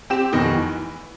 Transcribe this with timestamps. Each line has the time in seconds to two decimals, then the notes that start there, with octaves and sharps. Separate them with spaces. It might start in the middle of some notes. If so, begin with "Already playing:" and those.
0.10 C4 G4 E7
0.33 F1 B2 D#3 D#5
0.54 E3